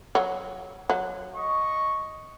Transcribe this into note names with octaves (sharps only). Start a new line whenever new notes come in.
F#3
F#3
D#5 C#6